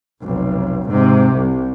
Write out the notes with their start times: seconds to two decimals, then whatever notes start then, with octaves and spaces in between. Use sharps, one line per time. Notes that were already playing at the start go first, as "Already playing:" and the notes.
0.23 F1 B1
0.88 G#2 C3
1.33 C2